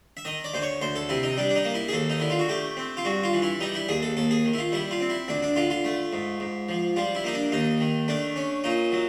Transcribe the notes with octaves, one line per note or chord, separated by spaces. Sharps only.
E5
D#3 D#5
D5
D2 C5
C#5
D2 C5
A4
C3 E4
D#4
G3 D4
D4
D#4
A#3
E4
G#4
D#2 A4
D#4
D3 E4
F4
F#4
A3 G4
C4
F4
G2 F#4
F4
E3
E4
G3 D#4
E4
D#2 G#4
A4
D#2 A4
G#4
D#3
E4
F4
G3 E4
F4
C4
E4
D2 D4
D4
D3 F4
F4
A3
G#2
G#2
F3
G3 F4
E4
A#3 D#4
D4
D#2 D#4
D#3
A3 D4
C#4
A#2 D#4
F#3